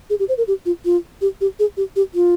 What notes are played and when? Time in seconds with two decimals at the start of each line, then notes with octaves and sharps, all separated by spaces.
0.10 G#4
0.20 G4
0.29 C5
0.38 A#4
0.48 G4
0.66 F4
0.85 F4
1.21 G4
1.41 G4
1.59 G#4
1.77 G4
1.96 G4
2.15 F4